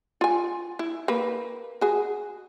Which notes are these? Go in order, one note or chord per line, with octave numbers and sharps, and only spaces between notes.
F4 G#5
E4
A#3 A#4 B4
F#4 G#4